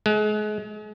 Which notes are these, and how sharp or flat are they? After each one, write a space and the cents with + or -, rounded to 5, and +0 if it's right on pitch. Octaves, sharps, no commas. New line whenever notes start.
G#3 +35